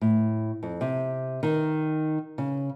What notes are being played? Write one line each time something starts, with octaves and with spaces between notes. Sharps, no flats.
A2
F2
C3
D#3
C#3